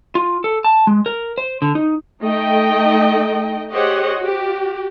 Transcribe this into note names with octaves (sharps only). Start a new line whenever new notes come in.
F4
A4
A5
G#3
A#4
C5
D3
D#4
A3 D#4 D#5 G5
G4 G#4 C5 C#5 D#5 F#5
F#4 G4